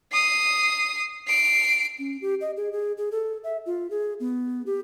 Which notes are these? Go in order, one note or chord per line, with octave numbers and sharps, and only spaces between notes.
D#6 C7
C7 D7
C#4
G4
D#5
G#4
G#4
G#4
A4
E5
F4
G#4
B3
G4